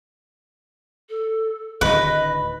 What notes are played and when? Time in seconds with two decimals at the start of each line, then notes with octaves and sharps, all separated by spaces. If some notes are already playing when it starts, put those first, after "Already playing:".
1.09 A4
1.81 D1 D3 D#3 B4 D#5